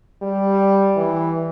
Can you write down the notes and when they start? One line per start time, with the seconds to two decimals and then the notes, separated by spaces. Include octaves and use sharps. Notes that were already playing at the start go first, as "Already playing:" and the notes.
0.22 G3
0.97 E3